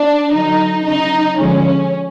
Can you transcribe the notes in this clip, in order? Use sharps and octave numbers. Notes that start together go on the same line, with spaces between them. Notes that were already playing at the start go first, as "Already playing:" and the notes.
Already playing: D4
D3 F#3 D#4
C#3 F#3 D#4
D3 F3 G#3 C#4